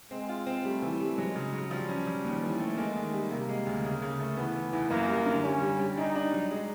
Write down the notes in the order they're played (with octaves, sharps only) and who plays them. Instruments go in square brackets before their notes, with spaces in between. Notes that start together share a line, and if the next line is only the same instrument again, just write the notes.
[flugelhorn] G#3 [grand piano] C4
[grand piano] F4
C4
[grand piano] G3 [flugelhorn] A3
[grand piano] E3
G3
[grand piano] F#3 [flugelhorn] G#3
[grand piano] C#3
F#3
[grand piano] F3 [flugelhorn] G3
[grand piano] C#4
F3
D#2
E3
A3
[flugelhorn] G#3 [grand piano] A#3
[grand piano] D#3
G3
[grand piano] C3 [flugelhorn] A#3
[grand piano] G#3
D2
C#3
C#3
A3
[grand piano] E3 [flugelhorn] B3
[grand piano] E3
E2
[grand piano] F#2 [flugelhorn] A#3
[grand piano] G3
D3
[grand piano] G3 [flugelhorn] C#4
[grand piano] G3
G3
[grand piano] D4 [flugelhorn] D#4
[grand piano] D4
F#3
G#3